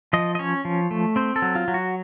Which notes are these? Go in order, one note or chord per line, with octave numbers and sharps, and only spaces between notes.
F3 D#5
D#5
C#4 C#5
F3
A3
C4 C5
A4
F#3
F4
F#3
F#4